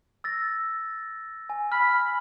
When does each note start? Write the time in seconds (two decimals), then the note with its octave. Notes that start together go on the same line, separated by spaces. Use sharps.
0.24 E6 A6 A#6
1.50 G#5
1.72 B5 F6